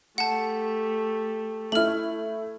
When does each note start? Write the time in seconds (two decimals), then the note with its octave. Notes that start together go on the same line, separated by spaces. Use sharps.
0.18 A3 G4 F#5 A5
1.72 A3 E4 F6 F#7